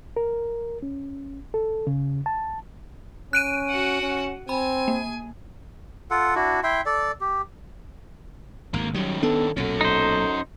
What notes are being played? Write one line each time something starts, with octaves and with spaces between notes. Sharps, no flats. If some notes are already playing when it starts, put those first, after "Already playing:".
A#4
C#4
A4
C#3
A5
C#4 F#6 D7 D#7
F#4 F#5
C#4
C4 G#5 B5
A#3
F4 A4 F#5
D4 E4 F#4
E4 E5 G5 C6
A4 D5
G4
G#1 D2 A#3
D#3 F#3 G3 C#4
B3 D4 A4
B1 A#2 C#4 F#4 A4
D#4 C5